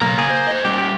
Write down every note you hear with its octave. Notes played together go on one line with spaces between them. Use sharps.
B1 C#3 A#3 A#5
A#3 G#4
C5
C5 D#5
G3 C#4 G4
G4